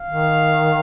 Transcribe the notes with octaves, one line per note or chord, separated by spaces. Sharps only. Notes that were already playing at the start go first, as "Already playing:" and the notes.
Already playing: F5
D#3